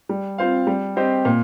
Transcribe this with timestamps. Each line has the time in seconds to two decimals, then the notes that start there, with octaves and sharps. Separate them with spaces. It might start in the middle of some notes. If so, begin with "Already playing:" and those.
0.09 G3
0.38 C4 F4 C5 F5
0.67 G3
0.96 C4 G4 C5 D#5
1.25 A#2